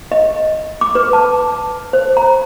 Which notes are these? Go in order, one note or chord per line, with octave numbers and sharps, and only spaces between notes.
D#5
D6
B4
A5
C5
A#5